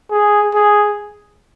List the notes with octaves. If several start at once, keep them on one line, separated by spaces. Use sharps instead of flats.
G#4
G#4